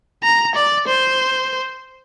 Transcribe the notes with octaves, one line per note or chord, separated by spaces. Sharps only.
A#5
D5
C5